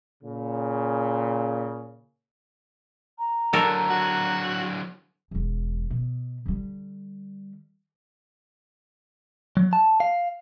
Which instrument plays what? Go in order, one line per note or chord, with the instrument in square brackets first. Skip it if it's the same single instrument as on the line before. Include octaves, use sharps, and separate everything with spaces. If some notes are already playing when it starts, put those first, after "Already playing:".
[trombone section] A#2 C#3
[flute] A#5
[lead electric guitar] D3 F#3 [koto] A4 A#4
[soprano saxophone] F#4
[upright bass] E1 E2
B2
D3 G3
[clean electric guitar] F#3
A5
F5